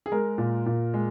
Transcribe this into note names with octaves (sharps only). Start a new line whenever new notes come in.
G#4
G#3 A#4
A#2
A#2
G#3